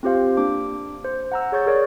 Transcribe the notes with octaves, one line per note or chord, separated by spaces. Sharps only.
C4 F4 G4 C5 F5
A#3 D4 D6
C5
F#5 A#5 E6
G#4 C#5 C#6 G6 A6
G#4 A#4 C#5 D5